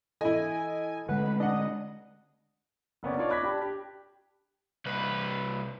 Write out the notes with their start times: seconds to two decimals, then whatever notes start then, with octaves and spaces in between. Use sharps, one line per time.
0.21 E3 E4 A4 D#5 G#5
1.09 D3 G#3 A3 B4 F#5
1.40 D4 D#5 F#5
3.03 F#1 B3 C#4 D5
3.17 D4 D#4 F4 C#5 D5
3.30 B5 D6 F#6 G#6 A#6 B6
3.43 D4 G4 A5 B5
3.61 G4
4.86 C2 B4